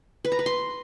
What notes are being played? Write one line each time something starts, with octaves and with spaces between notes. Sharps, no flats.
B4
A#5
B4
C6